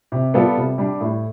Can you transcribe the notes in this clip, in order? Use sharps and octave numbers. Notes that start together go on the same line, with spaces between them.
C3
G3 B3 F4 A4
C3
G3 D4
A2